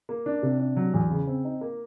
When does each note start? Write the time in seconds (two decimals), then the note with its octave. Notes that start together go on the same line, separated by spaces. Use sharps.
0.09 A#3
0.26 D4
0.43 C3
0.60 D4
0.76 F#3
0.94 E2
1.10 C#3
1.27 C4
1.45 D#4
1.61 A#3